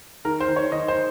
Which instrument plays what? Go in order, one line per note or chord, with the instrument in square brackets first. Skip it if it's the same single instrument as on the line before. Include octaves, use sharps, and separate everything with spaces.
[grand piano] D#3 A#4
C5
D#3
C#5
D#3 D#5
C5